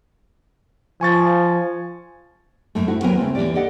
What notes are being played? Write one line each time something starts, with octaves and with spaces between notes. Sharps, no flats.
F3 G#5 C#6 A6
F#2 A3
C4 E4 F#4
D#2 F#3 B3 C4 A#4 G#5
C#3 A3 C4
D#2 B2 E3 G4 D5
G4 A4 D5 D#5 F#5